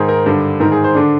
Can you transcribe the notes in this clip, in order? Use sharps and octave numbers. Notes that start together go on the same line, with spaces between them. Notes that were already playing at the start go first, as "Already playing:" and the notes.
Already playing: G#2 D#3 G#4
A#4
G2 D3
G#2 D#3 A#4
G#4
C5
D3 D4